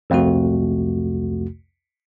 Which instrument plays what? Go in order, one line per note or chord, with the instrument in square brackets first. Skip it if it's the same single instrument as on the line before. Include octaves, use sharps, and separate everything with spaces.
[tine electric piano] C2 F2 C3 A3 F#4